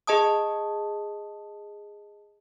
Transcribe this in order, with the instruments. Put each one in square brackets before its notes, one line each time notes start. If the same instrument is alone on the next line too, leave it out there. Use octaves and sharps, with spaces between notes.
[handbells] G#4 D#5 A5 D#6